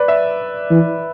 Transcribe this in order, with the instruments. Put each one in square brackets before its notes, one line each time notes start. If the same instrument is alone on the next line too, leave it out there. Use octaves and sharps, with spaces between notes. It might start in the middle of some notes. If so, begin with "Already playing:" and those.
Already playing: [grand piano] B4 D5
E5
[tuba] E3